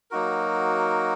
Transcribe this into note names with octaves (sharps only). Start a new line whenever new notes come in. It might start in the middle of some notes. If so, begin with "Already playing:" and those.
F#3 A#3 D#4 F#4 A#4